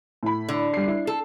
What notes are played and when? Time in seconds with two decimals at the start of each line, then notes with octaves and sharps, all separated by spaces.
0.23 A2 B5
0.49 D3
0.74 G3 C7
0.88 E4
1.07 A4